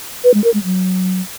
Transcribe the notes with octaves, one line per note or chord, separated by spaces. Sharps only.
B4
G#3
A#4
G#3
F#3